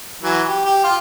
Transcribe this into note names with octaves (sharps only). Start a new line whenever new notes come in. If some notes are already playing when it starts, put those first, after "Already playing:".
E3 F#3
G4
G4
F4